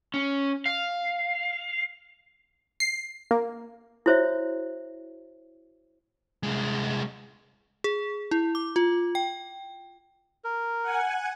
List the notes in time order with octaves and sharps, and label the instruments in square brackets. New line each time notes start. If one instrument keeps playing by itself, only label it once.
[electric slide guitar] C#4
F5
[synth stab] C7
A#3
[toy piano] E4 F#4 C5 C#5 E5
[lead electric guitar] C2 G#3
[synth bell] G#4
E4
D6
F4
G5
[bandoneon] A#4
[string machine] F#5 G#5